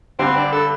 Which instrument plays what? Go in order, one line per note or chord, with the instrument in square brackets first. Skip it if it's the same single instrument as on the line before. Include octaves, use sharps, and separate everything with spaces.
[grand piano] G2 D3 G3 [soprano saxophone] C4
[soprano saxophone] D4
A4